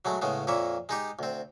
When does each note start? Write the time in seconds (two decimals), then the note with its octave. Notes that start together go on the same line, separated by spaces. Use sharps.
0.05 F#3 G#3 A3
0.22 A2 C#3 G#3 B3
0.47 F2 A#2 A#3 C#5 E5
0.89 G#3 D#4 G4
1.19 D2 C4